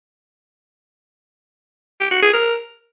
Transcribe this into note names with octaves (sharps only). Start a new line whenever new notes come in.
G4
F#4
G#4
A#4